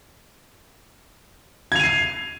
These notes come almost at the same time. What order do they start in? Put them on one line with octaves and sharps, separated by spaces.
G#6 F7 D#7 C7